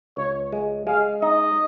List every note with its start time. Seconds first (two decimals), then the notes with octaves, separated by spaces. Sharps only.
0.17 C#2 C#5
0.52 G#3
0.87 G#3 F5
1.22 D#4 D#5